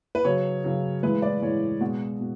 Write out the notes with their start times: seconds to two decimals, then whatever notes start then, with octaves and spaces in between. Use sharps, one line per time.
0.15 B4
0.25 C#3 F#3 C#5
0.64 C#3 F#3
1.03 A2 E3 G#3 B4
1.22 D5
1.43 A2 E3 G#3 C#5
1.81 B2 G#3 F#4
2.20 B2